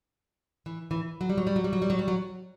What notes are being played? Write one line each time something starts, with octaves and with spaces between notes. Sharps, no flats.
E3
E3
F#3
G3
F#3
G3
F#3
G3
F#3
G3
F#3
G3
F#3